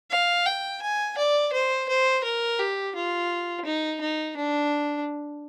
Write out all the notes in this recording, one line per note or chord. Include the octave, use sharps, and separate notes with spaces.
F5
G5
G#5
D5
C5
C5
A#4
G4
F4
D#4
D#4
D4